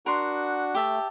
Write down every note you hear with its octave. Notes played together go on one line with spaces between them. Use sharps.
D4 F#4 A#4 F#5 C6
A3 G4 E5 A5